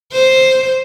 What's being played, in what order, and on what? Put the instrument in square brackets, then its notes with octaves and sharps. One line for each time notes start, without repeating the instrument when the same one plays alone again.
[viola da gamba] C5